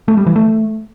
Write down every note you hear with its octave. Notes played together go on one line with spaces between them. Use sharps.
A3
G3
E3
A3